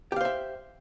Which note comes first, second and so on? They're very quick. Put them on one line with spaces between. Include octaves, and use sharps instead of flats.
G4 F5 C5 E5